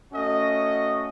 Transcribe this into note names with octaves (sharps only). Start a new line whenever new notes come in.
A3 C#4 F#4 D#5